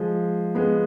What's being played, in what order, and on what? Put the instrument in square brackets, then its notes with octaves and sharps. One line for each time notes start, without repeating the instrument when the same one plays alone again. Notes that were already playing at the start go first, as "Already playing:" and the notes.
Already playing: [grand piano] F3 G#3
G#3 B3